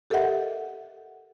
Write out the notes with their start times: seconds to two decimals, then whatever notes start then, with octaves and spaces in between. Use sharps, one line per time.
0.10 G4 A4 A#4 D#5 E5 F#5